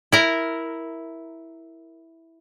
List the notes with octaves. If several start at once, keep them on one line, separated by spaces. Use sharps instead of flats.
E4 A#4